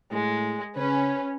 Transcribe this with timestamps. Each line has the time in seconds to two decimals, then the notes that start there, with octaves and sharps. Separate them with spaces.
0.12 A2 G#3
0.76 C#3 C#4 B4